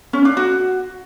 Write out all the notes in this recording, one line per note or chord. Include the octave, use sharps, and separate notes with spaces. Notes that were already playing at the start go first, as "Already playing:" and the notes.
C#4
D4
F#4